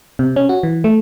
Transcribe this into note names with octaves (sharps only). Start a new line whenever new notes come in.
C3
C#4
F#4
E3
A3